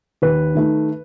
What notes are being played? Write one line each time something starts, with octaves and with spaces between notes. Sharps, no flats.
D#2 B4
D#3 A3 D#4